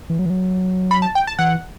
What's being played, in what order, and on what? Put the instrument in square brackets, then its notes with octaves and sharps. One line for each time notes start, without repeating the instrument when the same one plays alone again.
[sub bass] E3
F#3
E3
F#3
[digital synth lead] B5
A5
G5
A5
[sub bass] E3 [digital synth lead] F#5